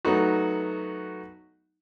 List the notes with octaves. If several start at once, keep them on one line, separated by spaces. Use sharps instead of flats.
F#3 A3 B3 D#4 F#4